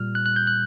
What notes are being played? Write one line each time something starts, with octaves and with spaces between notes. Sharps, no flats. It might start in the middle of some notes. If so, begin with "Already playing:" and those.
Already playing: A#2 G3 F6
F#6
F#6
G6
F#6